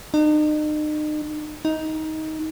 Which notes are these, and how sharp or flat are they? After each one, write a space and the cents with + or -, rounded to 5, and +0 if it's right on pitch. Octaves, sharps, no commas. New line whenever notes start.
D#4 -40
D#4 +15